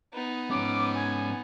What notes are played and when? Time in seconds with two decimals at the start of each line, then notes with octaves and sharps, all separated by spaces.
0.14 B3 D#4
0.51 G#2 C#4 D6
0.95 G#5